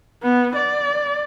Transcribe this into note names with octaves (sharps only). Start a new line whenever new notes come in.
B3
D5